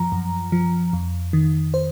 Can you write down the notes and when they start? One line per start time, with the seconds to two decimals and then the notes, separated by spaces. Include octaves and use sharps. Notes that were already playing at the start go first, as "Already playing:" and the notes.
Already playing: F#2 F3 A#5
0.12 F#2
0.52 F3
0.93 F2
1.33 D#3
1.74 C5